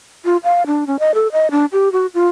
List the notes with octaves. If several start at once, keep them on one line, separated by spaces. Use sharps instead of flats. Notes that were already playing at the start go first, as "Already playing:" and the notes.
F4
F5
D4
C#4
D#5
A4
D#5
D4
G4
F#4
F4